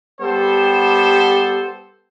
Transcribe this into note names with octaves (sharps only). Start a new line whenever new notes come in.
G3 B3 G4 A4 C5